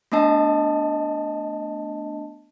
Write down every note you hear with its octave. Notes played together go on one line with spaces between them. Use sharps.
A3 B3 D4 D#5 A5